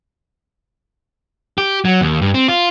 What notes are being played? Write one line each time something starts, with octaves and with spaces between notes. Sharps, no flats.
G4
F#3
D#2
G2
C4
F4